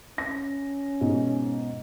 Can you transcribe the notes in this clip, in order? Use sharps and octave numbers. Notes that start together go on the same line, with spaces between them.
C#4 A#6
G#2 B2